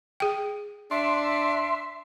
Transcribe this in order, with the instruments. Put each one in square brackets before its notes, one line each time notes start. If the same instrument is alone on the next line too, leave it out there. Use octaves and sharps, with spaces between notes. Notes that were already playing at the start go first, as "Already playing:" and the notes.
[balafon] G#4 G5
[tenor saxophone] D4 [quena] E5 [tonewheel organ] C6